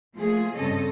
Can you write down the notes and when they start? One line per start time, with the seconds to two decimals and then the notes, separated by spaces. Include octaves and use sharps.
0.17 F3 A3 A#3 F4 G#4
0.56 G2 C#3 C4 A4 C#5 D#5